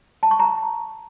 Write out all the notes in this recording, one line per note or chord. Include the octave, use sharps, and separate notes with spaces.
A5
C#6
A#5